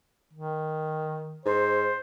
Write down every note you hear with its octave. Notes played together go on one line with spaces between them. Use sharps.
D#3
G#2 C5